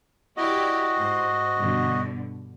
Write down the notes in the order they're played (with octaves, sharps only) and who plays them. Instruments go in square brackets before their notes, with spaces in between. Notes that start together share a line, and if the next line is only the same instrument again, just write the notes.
[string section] E4 G4 D5 [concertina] F#4 D#5
[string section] G#2 C5
G2 B2 D3